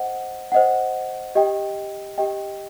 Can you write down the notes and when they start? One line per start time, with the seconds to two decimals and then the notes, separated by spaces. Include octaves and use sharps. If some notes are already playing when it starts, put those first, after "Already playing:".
Already playing: C5 D#5 F#5
0.52 C5 D#5 F#5
1.35 G4 D#5 G5
2.18 G4 D#5 G5